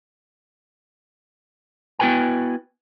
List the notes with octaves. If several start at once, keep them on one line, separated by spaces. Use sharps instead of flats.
B3 E4 F#4 B4 G5 G#5